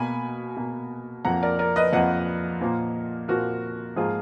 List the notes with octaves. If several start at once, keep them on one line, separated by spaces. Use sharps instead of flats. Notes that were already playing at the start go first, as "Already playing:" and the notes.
Already playing: B2 A#3 G#5 B5
B2 A#3
F2 F3 A#3 F#5 A#5
A#4 D5
A#4 D5
B4 D#5
F2 F3 A#3 D#5 F#5
A#2 F3 A#3
A#2 F3 A#3 F#4 A#4
G#2 F3 A#3 F4 G#4